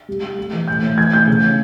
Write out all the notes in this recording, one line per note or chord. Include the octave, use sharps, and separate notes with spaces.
G3
G3
A3
E3
A2 G6
A2
E3 G#6
A2 G6
C#3
E3